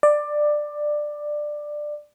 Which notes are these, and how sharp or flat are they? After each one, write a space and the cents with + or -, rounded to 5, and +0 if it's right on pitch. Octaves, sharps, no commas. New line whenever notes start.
D5 +15